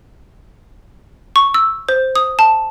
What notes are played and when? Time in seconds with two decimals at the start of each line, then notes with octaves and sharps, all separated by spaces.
1.36 C#6
1.54 E6
1.89 C5
2.16 D#6
2.39 A5